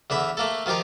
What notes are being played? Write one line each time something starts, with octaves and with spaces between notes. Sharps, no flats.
E2 D3 E5 B5
A3 A#3 A4
D#3 F3 F4 G4 A#4